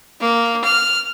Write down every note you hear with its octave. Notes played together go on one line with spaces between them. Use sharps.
A#3
F6